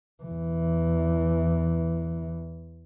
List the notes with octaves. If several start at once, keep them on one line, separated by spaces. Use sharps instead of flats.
E2 E3